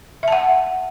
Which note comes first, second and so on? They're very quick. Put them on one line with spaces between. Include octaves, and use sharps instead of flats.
E5 A5 F#5